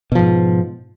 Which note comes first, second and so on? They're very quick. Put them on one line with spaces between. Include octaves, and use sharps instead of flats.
B2 F3 G#2